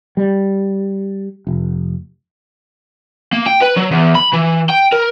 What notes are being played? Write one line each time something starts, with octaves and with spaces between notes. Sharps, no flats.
G3
F1
A#3
G5
B4
F#3
E2
B5
E3
G5
A#4